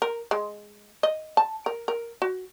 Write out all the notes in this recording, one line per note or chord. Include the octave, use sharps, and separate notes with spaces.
A#4
G#3
D#5
A5
A#4
A#4
F#4